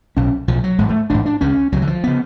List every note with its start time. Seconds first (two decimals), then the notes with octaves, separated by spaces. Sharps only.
0.17 B1 B2 C#4
0.48 B1 B2 F3
0.64 F#3
0.78 A1 G#2 G#3
0.89 A3
1.10 A1 G#2 D4
1.26 D4
1.41 C#2 C#3 C#4
1.72 C#2 C#3 F#3
1.82 D3
1.87 F3
2.04 C#3 B3